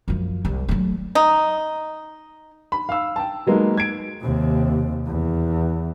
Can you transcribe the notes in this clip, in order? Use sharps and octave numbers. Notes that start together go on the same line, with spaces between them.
F#2 F3
C2
F#3 A3
D#4
B5
F5 E6
G5 A5
F#3 G#3 A#3 B3 D#4
G#6 D7
D#2 C3
E2